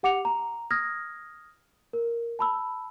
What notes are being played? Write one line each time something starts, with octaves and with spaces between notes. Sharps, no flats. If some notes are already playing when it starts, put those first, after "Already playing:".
G4 F#5 D6 C#7 F7
A#5
D#6 F6 G#6 A#6
A#4
A5 B5 E6